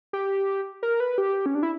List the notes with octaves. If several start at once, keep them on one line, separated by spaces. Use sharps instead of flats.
G4
A#4
B4
G4
C#4
D4
E4